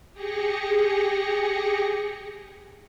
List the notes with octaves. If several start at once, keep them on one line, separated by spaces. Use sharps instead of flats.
G4 G#4 A#6 C#7